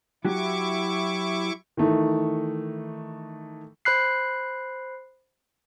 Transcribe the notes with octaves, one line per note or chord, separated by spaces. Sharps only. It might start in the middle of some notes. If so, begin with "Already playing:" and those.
F#3 E4 F#4 G4 C#6 D6
D#3 E3 A3 D#4
C5 B5 F#6 C7